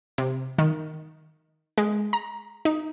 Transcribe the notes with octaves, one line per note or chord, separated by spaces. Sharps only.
C3
D#3
G#3
A#5
D#4